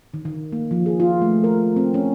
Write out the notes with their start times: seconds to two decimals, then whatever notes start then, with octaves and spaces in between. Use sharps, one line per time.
0.14 D#3
0.25 D#3
0.52 A#3
0.71 F3
0.86 G#4
1.00 F4
1.22 A3
1.44 A#4
1.76 C4
1.94 C#4